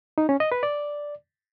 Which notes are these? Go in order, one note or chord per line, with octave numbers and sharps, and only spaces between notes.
D#4
C#4
D#5
B4
D5